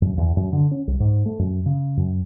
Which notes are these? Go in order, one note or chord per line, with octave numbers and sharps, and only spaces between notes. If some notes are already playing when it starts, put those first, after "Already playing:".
F#2
E2
F#2
D3
C#4
C2
G#2
A3
F#2
C#3
F#2